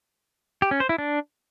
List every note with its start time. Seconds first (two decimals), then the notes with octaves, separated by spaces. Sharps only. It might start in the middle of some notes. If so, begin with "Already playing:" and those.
0.62 G4
0.71 C#4
0.80 C5
0.89 E4
0.98 D4